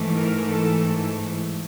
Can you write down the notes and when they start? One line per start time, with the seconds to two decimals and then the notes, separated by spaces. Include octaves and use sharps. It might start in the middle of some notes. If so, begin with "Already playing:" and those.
Already playing: G#2 E3 A3
0.15 A#4
0.51 A4